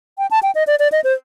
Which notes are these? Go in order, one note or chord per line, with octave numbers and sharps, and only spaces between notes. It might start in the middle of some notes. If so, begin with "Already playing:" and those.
G5
A5
G5
D#5
D5
D5
D#5
C5